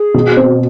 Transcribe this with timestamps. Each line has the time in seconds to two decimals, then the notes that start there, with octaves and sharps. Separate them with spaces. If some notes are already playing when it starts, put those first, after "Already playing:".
Already playing: G#4
0.14 B2
0.37 C4